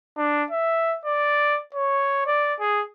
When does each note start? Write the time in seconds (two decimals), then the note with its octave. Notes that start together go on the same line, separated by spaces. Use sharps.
0.17 D4
0.51 E5
1.05 D5
1.75 C#5
2.27 D5
2.60 G#4